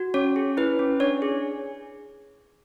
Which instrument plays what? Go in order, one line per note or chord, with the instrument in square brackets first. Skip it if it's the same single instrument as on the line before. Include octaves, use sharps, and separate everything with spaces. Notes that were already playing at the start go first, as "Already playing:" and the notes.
Already playing: [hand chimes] F#4
C#4 C#5
G#4
E4 B4
C#4
D4 C#5
G#4